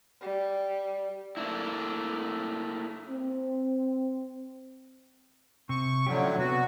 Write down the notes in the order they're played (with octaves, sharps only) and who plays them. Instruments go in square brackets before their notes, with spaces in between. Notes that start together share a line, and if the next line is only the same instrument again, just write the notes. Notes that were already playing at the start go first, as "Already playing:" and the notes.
[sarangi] G3
[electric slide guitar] A3 A#3 D4 E4
[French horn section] C4
[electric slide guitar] C3 [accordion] C#6
[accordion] A2 D3 F#3 [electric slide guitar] F3 C#4 G4
[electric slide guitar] C3 B3 [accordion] F#4